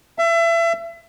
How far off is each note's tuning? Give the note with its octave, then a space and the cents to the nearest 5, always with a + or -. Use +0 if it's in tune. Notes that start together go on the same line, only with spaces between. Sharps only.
E5 +30